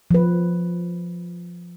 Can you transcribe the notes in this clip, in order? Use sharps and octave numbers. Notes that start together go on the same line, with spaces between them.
F3 B4